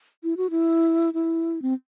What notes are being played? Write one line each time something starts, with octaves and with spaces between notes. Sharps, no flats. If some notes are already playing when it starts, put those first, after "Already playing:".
E4
F#4
E4
E4
C4